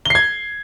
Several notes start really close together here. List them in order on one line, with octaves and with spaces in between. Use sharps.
G7 C7 G#6